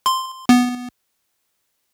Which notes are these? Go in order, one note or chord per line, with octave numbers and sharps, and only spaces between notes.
C6
B3